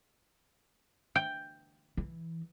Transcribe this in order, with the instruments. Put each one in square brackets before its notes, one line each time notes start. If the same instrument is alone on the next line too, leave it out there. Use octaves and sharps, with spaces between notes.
[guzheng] G5
[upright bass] E3